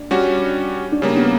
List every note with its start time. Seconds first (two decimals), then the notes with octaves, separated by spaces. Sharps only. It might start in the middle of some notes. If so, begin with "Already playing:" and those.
Already playing: D4
0.11 G3 C#4 F#4
0.92 D4
1.01 C#3 G3 A#3 C#4
1.17 B3